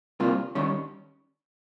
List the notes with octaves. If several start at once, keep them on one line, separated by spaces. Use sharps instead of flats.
C3 G3 A#3 F4
D#3 G3 C#4